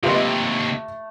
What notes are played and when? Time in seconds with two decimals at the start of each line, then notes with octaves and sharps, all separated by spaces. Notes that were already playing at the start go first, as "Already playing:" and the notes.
0.03 D#2 C3 A3 F4 G4 B4 D#5